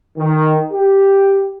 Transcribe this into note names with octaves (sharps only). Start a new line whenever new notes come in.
D#3
G4